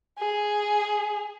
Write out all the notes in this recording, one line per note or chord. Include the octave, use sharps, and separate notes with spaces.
G#4